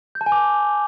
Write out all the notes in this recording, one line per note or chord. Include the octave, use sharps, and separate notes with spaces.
G6
A5
G#5
D6